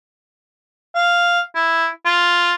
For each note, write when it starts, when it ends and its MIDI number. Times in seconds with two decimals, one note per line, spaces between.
0.95 1.41 77
1.55 1.88 64
2.05 2.54 65